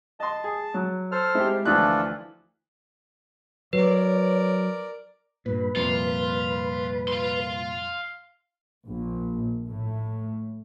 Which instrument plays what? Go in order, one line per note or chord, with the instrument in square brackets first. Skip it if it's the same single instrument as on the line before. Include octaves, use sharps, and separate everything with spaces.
[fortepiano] D#5 C6 [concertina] A5
[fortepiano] G#4
F#3
[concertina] A4 C5 F6
[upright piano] G#3 C4 [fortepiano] E4 G4
[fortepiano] D2 E3 F3 [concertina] D4 F4 A4 [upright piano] F#6
[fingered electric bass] F#3 [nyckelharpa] A#4 D5 [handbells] B4 [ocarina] C#5
[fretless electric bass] G2 A#2 [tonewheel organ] B4
[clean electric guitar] C2 A#2 [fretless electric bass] F2 [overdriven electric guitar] F4
[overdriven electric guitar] F5 C6
[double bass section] A#1
A2